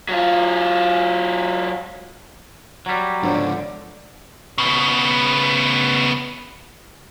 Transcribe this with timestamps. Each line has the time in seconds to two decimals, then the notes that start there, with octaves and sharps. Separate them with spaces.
0.09 F#3 F4
2.86 F#3 G3
3.23 G#2 D3 F3 D4 C5 C#5
4.58 C#3 B3